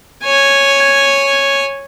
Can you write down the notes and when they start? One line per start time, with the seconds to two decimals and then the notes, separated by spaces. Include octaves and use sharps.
0.24 C#5 G#5